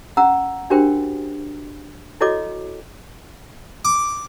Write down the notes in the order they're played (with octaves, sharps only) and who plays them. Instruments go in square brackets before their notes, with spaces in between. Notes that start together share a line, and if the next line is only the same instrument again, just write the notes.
[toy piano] C#4 F#5 A#5 E6
D4 F#4 G4 A#4 C5 G5
E4 F#4 A4 C#5 D#5 D6
[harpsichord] D6